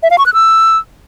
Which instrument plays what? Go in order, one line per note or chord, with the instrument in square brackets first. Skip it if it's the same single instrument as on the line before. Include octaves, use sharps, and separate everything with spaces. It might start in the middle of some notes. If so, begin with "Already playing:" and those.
[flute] E5
F5
C#6
F#6
E6